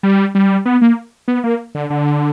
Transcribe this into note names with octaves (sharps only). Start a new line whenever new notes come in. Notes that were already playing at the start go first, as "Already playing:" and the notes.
G3
G3
B3
A#3
B3
A#3
D3
D3